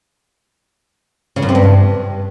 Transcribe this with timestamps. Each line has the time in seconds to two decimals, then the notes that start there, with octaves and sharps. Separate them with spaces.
1.36 C#3
1.42 F#2
1.49 C3
1.55 G2